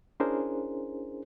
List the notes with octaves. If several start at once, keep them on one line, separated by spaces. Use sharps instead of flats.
C#4 D4 E4 G#4 A#4 C5